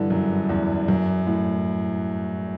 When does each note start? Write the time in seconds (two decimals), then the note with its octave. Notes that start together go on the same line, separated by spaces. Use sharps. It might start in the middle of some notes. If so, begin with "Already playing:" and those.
Already playing: G2 D3 E3
0.10 F#2
0.49 E2
0.88 F#2
1.27 A2